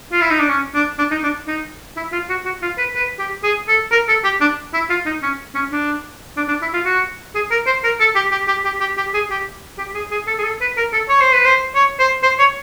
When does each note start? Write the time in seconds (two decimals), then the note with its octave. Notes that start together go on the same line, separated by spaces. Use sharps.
0.12 F4
0.21 E4
0.30 D#4
0.40 D4
0.49 C#4
0.75 D4
0.99 D4
1.11 D#4
1.23 D4
1.47 D#4
1.97 E4
2.12 F4
2.29 F#4
2.45 F#4
2.62 F4
2.78 B4
2.95 B4
3.19 G4
3.44 G#4
3.68 A4
3.92 A#4
4.08 A4
4.24 G4
4.41 D4
4.74 E4
4.90 F4
5.06 D#4
5.23 C#4
5.55 C#4
5.72 D4
6.37 D4
6.48 D4
6.62 E4
6.74 F4
6.85 F#4
7.35 G#4
7.51 A#4
7.67 C5
7.84 A#4
8.00 A4
8.15 G4
8.32 G4
8.48 G4
8.65 G4
8.81 G4
8.98 G4
9.14 G#4
9.30 G4
9.78 G4
9.95 G#4
10.11 G#4
10.27 A4
10.39 G#4
10.44 A4
10.61 B4
10.77 A#4
10.93 A4
11.09 C#5
11.21 C5
11.34 B4
11.45 C5
11.75 C#5
11.99 C5
12.23 C5
12.39 C#5